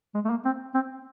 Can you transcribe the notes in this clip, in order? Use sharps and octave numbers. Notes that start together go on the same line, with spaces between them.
G#3
A3
A#3
C4
C4